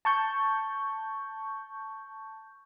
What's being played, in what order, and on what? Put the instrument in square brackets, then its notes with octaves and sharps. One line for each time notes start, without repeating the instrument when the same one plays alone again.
[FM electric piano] A5 C#6 G6